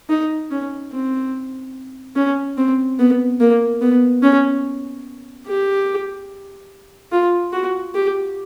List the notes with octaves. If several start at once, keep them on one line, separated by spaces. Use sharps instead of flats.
D#4
C#4
C4
C#4
C4
B3
A#3
B3
C#4
G4
F4
F#4
G4